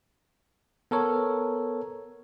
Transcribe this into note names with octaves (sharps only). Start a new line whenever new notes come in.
B3 A4 A#4 C#5